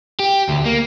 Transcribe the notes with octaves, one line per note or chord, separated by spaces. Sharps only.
G4
D2
A#3